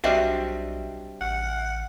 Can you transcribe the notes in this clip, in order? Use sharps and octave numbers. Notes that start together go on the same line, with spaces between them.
B1 G3 C4 D4 F#4 D#5 E5
A1 F#5